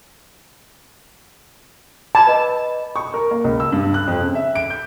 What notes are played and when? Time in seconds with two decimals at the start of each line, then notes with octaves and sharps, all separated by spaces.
2.15 A5 B5 D6 G#6
2.27 B4 D#5 B5
2.96 C#6
3.14 A#4
3.31 A#3
3.44 C#2
3.60 E6
3.72 G2
3.94 F#6
4.08 F2
4.20 C#3
4.35 E5
4.55 D7
4.70 G6